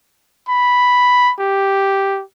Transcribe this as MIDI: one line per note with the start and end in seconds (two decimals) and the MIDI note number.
0.48 1.32 83
1.39 2.22 67